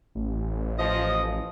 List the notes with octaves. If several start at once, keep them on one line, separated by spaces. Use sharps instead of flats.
A1
F3 D#5